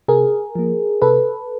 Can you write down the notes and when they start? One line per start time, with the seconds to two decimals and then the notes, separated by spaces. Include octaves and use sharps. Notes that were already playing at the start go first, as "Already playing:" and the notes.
0.08 C3 G#4 A#4
0.55 F3 A#3
1.02 C3 A4 B4